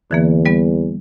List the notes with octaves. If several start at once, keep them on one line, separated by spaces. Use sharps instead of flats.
E2 D3 E3 A#3
G3 B3